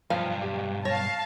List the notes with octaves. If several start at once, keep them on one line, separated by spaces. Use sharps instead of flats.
B1 G2 F3 F5
G4
C#5 F5 A5 A#6